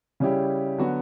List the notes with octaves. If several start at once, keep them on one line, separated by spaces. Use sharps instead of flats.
C#3 G3 C#4 E4 G4
D3 F#3 B3 F#4